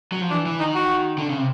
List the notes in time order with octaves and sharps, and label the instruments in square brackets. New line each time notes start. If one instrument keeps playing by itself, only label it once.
[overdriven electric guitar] F#3
F3
[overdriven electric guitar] E3 [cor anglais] D4
[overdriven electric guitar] E3
[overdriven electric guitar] D#3 [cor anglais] D#4
[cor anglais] F#4
[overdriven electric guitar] D3
C#3
C3